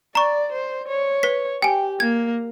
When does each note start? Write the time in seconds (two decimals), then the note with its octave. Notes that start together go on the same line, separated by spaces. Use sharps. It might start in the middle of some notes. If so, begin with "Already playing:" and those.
0.15 D5 A#5 C#6
0.52 C5
0.88 C#5
1.23 B4 B6
1.62 G4 G5 G#5
2.00 A#3 G#6